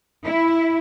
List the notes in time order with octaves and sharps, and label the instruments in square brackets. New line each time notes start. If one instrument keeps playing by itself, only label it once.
[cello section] E4